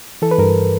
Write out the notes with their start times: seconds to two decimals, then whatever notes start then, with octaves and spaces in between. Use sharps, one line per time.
0.22 E3 A4
0.31 B4
0.38 G2 A#4